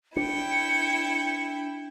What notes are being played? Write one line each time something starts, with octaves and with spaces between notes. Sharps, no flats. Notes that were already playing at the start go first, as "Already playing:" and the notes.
D4 E4 G5 C#7